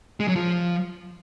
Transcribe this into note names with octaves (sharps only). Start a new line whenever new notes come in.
G#3
F#3
F3